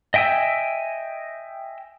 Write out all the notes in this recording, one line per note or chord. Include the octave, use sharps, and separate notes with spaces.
D#5 E5 G5 G#5 E6